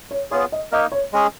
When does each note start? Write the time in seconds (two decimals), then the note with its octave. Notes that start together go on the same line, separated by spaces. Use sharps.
0.11 C#5
0.31 B3 F4 G#4 C#5
0.52 D#5
0.72 A#3 D#4 A#4 D#5
0.92 C#5
1.13 G#3 C#4 G#4